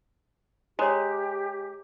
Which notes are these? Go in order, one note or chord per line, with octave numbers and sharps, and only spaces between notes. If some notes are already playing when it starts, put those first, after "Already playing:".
G#3 G4 C#5 A#5